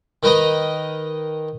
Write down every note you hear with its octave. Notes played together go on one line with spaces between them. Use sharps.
D#3 A#4 B4 D#5 A#5